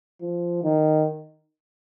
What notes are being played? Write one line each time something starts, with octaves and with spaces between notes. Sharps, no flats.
F3
D#3